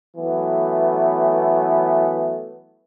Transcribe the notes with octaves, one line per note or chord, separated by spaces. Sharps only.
E3 F#3 A3 B3